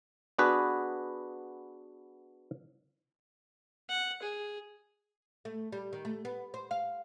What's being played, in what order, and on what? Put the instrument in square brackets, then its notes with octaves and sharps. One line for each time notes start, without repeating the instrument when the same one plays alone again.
[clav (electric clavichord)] B3 D4 F#4 G#4 B4
[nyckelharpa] F#5
G#4
[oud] A3
G3
D#3
A3
B3
C5
F5